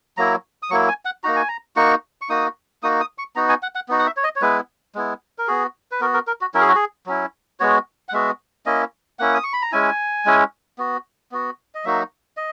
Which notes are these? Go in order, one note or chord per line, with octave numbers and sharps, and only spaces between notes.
F#3 A#3 E4 A#5
D#6
F#3 A#3 E4 C#6
G#5
F#5
A#3 D#4 F#4 A#5
G#5
A#5
A#3 D#4 F#4 C#6
C#6
A#3 D#4 F#4 D#6
A#3 D#4 F#4 D#6
D#6
C#6
B3 D#4 F#4 A#5
G#5
F#5
F#5
B3 D#4 F#4
F#5
E5
C#5
D#5
C#5
G#3 B3 E4 B4
G#3 B3 E4
A#4
B3 F#4 G#4
B4
B3 F#4 A#4
A#4
A#4
F#4
F#3 C#4 E4 A#4
G#4
F#4
G#4
F#3 C#4 E4
G#3 B3 F#4 C#5
F#5
G#3 B3 F#4 E5
A#3 C#4 E4 D#5
A#3 C#4 E4 F#5
D#6
C#6
B5
A#5
G#3 C#4 E4 G#5
G#3 C#4 E4
B3 F#4
B3 F#4
D#5
F#3 A#3 D#4 F#4 E5
D#5